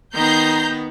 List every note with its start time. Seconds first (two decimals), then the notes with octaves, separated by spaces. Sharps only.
0.14 D#3 B3 A#5 G6 C7